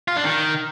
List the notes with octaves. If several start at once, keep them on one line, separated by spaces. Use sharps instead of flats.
F4
D4
D#3